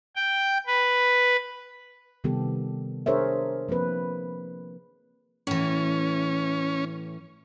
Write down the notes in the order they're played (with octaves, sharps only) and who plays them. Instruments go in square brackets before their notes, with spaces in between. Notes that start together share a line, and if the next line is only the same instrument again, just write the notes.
[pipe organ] G5
B4
[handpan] C3 D#3 G3 B3 G4 A4
D4 G#4 A#4 C5 C#5 E5
F3 A#3 C4 B4
[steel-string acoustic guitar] A2 E3 [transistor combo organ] C#4